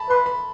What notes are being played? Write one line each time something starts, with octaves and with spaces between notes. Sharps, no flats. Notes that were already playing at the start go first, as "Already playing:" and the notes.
Already playing: A5 B5
B4 C6
B5